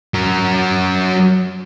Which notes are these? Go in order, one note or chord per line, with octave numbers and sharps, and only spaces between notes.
F#3 A#4